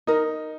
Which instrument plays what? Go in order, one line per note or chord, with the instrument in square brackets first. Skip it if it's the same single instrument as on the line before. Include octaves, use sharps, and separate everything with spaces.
[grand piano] D#4 [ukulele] A#4